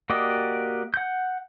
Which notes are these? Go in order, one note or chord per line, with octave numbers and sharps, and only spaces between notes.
A#3 F#4 G4 D5 D#5
F#5 G6